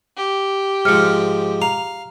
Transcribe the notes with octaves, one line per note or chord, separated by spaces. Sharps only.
G4
G#2 F3 F6 C#7
F5 A#5